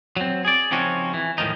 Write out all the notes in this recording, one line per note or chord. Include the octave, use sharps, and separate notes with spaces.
F#3 C4
G#4 D5
C#3 F3 C4 C#4 D#4 F#4
E3
A2 D#3 F3 D#4